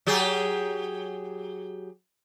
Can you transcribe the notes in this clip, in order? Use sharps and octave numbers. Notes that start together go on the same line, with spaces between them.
F#3 G4 G#4